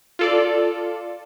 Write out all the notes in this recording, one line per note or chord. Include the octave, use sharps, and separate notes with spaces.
F4 A4 D5